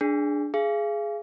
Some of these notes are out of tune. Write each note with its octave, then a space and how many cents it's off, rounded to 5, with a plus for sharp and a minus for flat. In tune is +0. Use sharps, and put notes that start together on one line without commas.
D4 +0 G#4 +5
G#4 +10 F5 -30